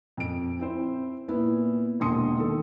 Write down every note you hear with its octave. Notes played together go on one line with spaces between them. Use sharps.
F2 D7
C4 E4 C5
A#2 B3 E4
E1 A#1 D3 C6 D#6 C#7
D#3 A4